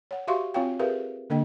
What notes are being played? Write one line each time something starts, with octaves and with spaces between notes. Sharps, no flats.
C#5 F#5
F#4 G4 E5 F5 C6 C#6
C4 F4 C#5 F5 G5
G4 G#4 A#4 B4 E5 F5
D3 A#3 D4 D#5 G5